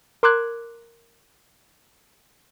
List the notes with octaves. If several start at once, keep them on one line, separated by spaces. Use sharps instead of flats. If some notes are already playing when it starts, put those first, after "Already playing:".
A#4 C6 D6 E6 F#6 G#6